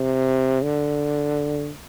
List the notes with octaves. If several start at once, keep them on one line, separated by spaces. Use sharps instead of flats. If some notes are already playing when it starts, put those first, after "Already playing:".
Already playing: C3
D3